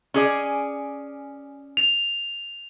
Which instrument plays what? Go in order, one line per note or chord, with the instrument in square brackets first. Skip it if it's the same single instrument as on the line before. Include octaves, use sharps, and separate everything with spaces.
[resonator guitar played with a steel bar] C#4 G#4 D5
[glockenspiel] F7